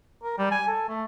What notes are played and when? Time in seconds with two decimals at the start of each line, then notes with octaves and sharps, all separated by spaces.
0.23 A#4
0.38 G3
0.51 G#5
0.68 A4
0.88 A3